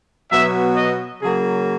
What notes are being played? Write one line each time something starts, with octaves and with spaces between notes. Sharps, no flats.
B2 F#3 B3 E5
D#5
C#3 F#3 A#3 G#4